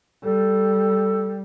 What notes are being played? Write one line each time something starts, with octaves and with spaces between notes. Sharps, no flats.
G3 A4